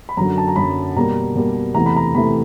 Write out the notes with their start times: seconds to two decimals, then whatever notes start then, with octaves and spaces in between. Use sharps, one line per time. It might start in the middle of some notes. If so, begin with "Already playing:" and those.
0.09 B5
0.17 F#2 D3 F#3 A#5
0.38 A5
0.48 A#5
0.56 F#2 D3 F#3 B5
0.96 B2 G3 A#3 A#5
1.35 B2 G3 A#3
1.75 E2 C3 E3 A3 A#5
1.86 B5
1.97 A#5
2.15 E2 C3 E3 A3 B5